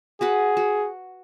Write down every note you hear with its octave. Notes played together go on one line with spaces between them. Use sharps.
F#4 G#4 B4 F#5
F#4